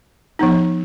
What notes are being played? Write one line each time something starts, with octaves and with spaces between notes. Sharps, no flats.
F3 B3 D#4